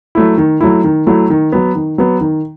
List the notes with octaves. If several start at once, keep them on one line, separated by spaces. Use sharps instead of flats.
F#3 A3 E4
D#3
F#3 A3 E4
D#3
F#3 A3 E4
D#3
F#3 B3
D#3
F#3 B3
D#3